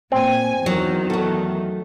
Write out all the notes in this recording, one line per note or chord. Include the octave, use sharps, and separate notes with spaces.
A#2 C4 G#5
E2 D#3 F#3 F#4
A3 F#4